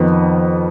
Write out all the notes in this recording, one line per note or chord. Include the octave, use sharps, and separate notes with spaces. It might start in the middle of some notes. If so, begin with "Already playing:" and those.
Already playing: F2 D#3 B3